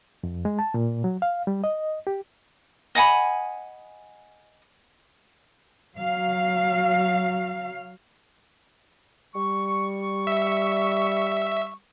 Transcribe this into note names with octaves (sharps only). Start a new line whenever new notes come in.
F2
G#3
A5
A#2
F#3
F5
G3
D#5
G4
D#5 F#5 G#5 B5
F#3 F5
G3 C#6
E5